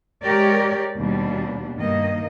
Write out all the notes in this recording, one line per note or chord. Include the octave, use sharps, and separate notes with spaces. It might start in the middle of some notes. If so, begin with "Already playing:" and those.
G#3 G4 A#4 C#5 D5
D#2 B2 G3 D4
G2 D#3 A#3 D#5